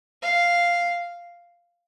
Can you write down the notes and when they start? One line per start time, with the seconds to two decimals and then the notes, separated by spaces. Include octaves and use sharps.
0.22 F5